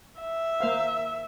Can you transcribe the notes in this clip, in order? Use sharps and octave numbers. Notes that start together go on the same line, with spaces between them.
E5
A#3 C5 F5